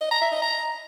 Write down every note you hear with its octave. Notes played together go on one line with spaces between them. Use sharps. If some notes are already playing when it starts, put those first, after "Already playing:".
D#5
A#5
E5
D#5
A#5